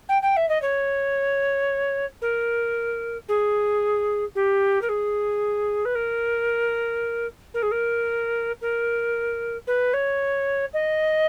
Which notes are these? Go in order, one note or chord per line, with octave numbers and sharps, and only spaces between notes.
G5
G5
E5
D#5
C#5
A#4
G#4
G4
A#4
G#4
B4
A#4
A#4
G#4
A#4
A#4
B4
C#5
D#5